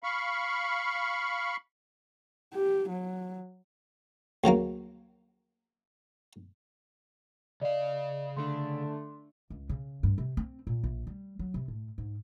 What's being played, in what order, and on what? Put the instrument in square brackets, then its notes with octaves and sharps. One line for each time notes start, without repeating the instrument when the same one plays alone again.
[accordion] F5 B5 C#6
[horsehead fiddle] G4
F#3
[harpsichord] D2 C#3 F#3 A#3
[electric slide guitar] C#3 F5 [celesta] D5 D#5
[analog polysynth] D3 A3 D4 [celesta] C6
[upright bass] C#2
C#3
G2
C3
C4
A#2
A#1
G3
F#3
C3
A2
G#2